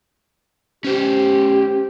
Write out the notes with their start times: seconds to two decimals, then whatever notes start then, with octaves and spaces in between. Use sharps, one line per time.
0.84 C#4 G4 C5